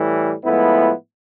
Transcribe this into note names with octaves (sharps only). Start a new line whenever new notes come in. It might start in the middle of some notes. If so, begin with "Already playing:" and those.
Already playing: A2 E3 G3
A2 F3 G#3 B3 E4